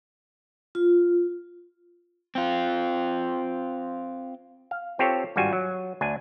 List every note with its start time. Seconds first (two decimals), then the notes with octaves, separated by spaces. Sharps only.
0.75 F4
2.35 C4 F4
4.71 F5
4.99 C4 F4 G4 A4 C#5
5.36 G#1 G2 G3 F4 F#4 G#5
5.53 F#3
6.01 D2 D4 G#5